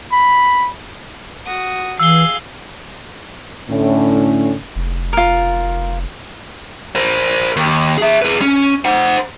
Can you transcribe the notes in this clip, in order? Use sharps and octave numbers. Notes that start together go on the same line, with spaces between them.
B5
F#4 D#6
E3 G#4 F5 E6 G7
A2 D3 C#4
F1
F4 A#4
A#4 C5
D#2
G#4 E5
G#4 B4
C#4
C5 F#5